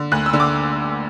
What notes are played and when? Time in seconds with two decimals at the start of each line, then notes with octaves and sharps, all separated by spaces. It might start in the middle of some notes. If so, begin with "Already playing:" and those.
Already playing: D3
0.12 D2 F#6
0.26 E6
0.33 D3
0.40 D6